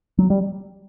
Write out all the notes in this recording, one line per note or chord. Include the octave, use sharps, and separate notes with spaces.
F#3
G3